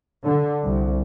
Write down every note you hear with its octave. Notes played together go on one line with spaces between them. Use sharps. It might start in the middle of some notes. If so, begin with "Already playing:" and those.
D3
C2